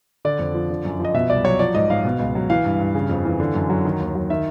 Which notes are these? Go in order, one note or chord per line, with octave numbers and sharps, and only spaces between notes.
D3 D5
F2
F3
D3
F#2
F3 D#5
B2 E5
C2 D5
F#3 C#5
F3 D5
G#2 D#5
G#2 F5
B2
C#2
F#3
E3 F5
G2
G2
C#3
F2
E3
D3
F#2
F#3
D#3
D#2
F#3
D#3 E5